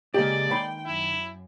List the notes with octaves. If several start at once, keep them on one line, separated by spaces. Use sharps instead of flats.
C#3 G#3 A#3 G4 D5 D#5
D#3 G5 B5 C6
F#2 E4